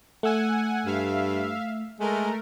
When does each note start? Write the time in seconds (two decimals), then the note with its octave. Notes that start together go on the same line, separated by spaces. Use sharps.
0.23 A3 F#5 G#5 E6
0.86 G2 E5 F5
2.00 G#3 A3 A#4